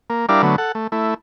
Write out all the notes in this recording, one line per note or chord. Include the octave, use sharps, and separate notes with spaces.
A#3
G3 D4 E4 A#4 D5 F5
D3 F#3 A3 B3
A4 F#5
A3
A3 E4